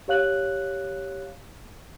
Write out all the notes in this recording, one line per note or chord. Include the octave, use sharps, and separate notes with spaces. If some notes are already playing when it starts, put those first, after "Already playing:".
G4 C#5 F5 F#6 F#7